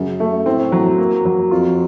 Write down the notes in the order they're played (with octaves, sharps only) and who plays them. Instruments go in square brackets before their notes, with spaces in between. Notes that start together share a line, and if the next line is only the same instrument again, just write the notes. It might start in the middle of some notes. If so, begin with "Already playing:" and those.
Already playing: [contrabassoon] F#2 [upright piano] C#3
[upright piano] A3
[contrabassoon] A2 [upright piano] C4
[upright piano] F#3
A#3
F#3
[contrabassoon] F2 [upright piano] F4